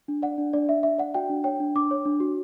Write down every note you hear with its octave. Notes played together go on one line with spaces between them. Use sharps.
D4
D5 F#5
D4
D4 D5
D4 E5
D4 E5
D5 F#5
F#4 G5
D4
C#5 G5
D4
D4 D6
C#5
D4
F#4